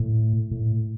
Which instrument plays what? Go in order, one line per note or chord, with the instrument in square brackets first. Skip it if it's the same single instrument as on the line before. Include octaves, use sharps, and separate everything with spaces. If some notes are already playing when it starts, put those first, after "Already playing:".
Already playing: [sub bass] A2
A2